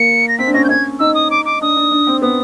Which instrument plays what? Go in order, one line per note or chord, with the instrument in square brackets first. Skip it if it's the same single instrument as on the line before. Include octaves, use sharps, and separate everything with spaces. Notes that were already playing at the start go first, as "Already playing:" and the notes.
Already playing: [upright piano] A#3 [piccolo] C#7
[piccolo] A#6
[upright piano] C4 [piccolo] B6
[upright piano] D4
[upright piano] C#4 [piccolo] A#6
[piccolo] G6
[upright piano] C#4 [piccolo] G#6
[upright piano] D#4 [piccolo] E6
[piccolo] D#6
D6
D6
[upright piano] D4 [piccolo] D#6
[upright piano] D4
D4
C4
[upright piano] B3 [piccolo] D#6